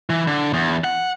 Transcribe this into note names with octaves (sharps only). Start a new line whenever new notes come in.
E3
D3
E2
F#5